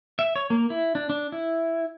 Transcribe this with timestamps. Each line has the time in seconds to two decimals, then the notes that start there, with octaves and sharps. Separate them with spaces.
0.19 E5
0.36 C#5
0.50 A#3
0.70 E4
0.95 D4
1.10 D4
1.32 E4